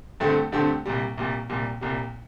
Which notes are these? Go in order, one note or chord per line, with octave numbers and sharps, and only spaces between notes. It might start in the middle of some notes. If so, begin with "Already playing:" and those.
G2 D3 A3 C4 G4
G2 D3 A3 C4 G4
C2 A#2 G3
C2 A#2 G3
C2 A#2 G3
C2 A#2 G3